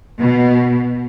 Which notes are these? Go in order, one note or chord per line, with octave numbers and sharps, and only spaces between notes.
B2